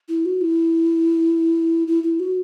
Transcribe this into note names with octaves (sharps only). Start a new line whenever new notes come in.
E4
F#4
E4
E4
E4
F#4